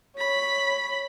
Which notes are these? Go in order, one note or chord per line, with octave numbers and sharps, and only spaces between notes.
C#5 B5